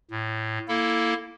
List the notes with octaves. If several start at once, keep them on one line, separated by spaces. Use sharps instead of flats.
A2
A#3 E4 A4